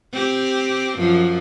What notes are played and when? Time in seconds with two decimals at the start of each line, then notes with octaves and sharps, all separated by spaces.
0.13 C4 G4
0.99 F#2 F3